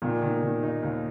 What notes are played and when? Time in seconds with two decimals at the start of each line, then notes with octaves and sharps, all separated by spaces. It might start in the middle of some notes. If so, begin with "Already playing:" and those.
0.02 A#2 D#3
0.22 D#3
0.43 D#3
0.63 D#4
0.83 D#2